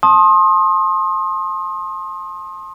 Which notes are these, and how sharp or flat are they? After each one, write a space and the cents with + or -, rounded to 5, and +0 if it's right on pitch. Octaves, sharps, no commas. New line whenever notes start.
A5 +0 C6 +30 D#6 +0